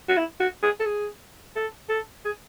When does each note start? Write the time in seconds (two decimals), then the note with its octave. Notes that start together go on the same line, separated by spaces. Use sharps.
0.09 F#4
0.17 E4
0.40 F#4
0.63 G#4
0.80 A4
0.86 G#4
1.56 A4
1.89 A4
2.25 G#4